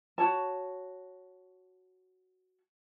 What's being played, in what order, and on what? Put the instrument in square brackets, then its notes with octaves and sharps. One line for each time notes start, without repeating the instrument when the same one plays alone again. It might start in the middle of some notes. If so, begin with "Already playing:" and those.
[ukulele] F#4 C#5 A5